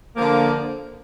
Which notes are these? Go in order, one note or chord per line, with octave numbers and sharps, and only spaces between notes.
D3 F3 A#3